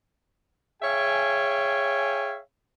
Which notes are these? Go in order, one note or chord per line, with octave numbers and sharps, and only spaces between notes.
G#4 C#5 E5 F5 G5 G#5